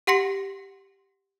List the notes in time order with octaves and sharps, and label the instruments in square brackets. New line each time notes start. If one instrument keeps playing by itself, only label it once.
[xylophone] G4 F#5 C6 A#6 C#7